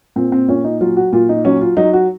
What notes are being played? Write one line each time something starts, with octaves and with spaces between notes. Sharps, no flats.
A#2 C4
C4
A#2 C#4
D#4
F#3 F4
F#4
A#2 F4
D#4
F#3 C#4
F4
F#3 D#4
F#4